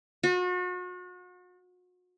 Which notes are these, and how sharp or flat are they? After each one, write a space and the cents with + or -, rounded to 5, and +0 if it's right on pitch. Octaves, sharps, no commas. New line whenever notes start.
F#4 -40